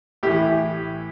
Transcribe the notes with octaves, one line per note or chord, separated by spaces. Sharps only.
A2 E3 E4 G4